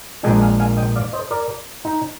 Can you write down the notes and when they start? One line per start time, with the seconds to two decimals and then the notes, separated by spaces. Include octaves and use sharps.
0.23 A#1 A#2 G#3 D4 D#5 G5
0.41 F5 G#5
0.60 F5 G#5
0.77 D#5 G5
0.96 D5 F5
1.13 C5 D#5
1.31 A#4 D5
1.85 D#4